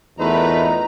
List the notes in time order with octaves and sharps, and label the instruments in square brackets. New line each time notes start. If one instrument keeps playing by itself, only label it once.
[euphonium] E2 [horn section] A3 A#4 B4 [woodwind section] D#4 F4 [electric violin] A#5